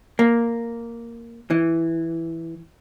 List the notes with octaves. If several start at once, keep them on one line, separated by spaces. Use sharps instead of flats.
A#3
E3